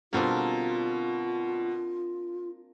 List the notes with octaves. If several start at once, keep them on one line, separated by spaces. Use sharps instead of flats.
B2 D3 G3 A#3 C4 D4 F4